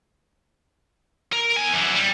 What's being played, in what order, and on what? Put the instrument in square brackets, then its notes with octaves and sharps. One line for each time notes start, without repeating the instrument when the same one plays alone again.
[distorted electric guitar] A#4
E2 G#5
F#2 E3
G3